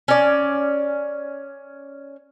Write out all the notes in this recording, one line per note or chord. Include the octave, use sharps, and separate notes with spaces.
C#4 D5